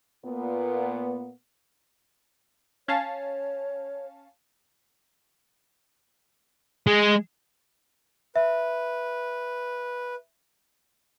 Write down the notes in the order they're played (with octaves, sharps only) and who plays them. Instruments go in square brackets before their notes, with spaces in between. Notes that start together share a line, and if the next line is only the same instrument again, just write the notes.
[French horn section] A#2 B3
[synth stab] C#4 F5 A5 [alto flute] C#5
[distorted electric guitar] G#3
[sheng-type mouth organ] B4 [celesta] E5